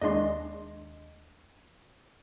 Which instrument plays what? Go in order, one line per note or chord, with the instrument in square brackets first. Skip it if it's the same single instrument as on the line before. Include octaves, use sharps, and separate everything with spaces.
[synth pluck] D#2 G#3 D4 [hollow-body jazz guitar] D#5 C6